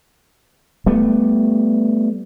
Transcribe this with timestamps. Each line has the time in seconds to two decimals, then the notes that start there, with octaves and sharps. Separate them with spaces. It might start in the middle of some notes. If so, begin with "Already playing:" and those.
0.86 G3 A3 B3